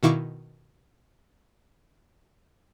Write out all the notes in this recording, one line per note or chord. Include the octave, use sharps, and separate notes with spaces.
B2 D#3 E4 F5 C#6 D6